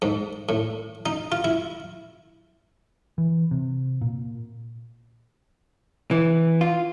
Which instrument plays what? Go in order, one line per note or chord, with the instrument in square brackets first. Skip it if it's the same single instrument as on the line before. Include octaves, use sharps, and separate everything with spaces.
[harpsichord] G#2
A2
D#4
F4
E4
[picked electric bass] E3
C3
A#2
[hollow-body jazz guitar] E3
F4